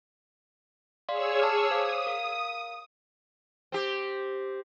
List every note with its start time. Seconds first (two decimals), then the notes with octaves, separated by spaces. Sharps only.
1.09 G#4 C#5 D5 F5 C6 E6
1.39 A5 D6 F6
1.71 C5 F5 D6 D#6
2.07 A#4 F5
3.72 C4 G4